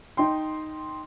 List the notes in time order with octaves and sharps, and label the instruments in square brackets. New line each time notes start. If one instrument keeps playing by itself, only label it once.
[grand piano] D#4 G5 C6